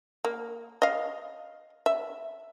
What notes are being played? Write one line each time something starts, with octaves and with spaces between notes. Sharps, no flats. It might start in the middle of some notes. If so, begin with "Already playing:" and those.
A#3
D#5 F5
E5